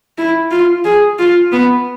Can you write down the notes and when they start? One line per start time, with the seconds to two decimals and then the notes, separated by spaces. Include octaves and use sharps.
0.18 E4
0.51 F4
0.85 G#4
1.19 F4
1.52 B3